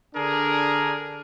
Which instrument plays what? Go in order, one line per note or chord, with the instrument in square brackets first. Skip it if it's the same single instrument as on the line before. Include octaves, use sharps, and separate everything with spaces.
[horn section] D3 D4 G#4 A#4